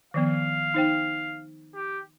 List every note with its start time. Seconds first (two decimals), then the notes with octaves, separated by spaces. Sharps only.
0.14 D#3 F3 B3 F5
0.74 D#4 C5 G5
1.75 G4